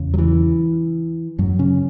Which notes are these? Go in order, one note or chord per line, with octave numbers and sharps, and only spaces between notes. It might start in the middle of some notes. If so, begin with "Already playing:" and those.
Already playing: E2 C#3
F#3
E3
F#2 F#3
C#3 C#4